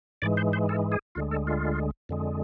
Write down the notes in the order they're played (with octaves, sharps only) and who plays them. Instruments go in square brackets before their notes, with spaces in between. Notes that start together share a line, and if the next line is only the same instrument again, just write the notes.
[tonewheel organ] G#2 E3 G#3 D5
C5
C5
A4
G#4
D2 D3 G#3 F4
A4
F4
F2 D3 G#3